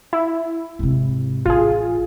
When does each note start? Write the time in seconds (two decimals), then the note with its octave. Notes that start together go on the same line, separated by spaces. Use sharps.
0.13 E4
0.79 G#2 C3
1.46 A1 F4 G#4